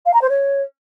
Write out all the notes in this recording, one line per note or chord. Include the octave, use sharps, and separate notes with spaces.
F5
A#5
C5
C#5